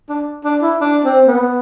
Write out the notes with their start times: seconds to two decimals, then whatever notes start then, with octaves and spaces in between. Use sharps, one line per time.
0.09 D4
0.44 D4
0.62 E4
0.81 D4
1.04 C4
1.28 B3